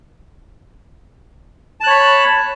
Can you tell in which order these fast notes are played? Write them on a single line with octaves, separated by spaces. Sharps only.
A5 F#6 C#5 B5